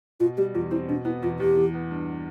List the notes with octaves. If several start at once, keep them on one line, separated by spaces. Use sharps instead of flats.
B2 F4
G3 G4
E2 F4
C4 E4
B2 D4
B3 E4
E2 F4
E2 G4
E3
B3
G2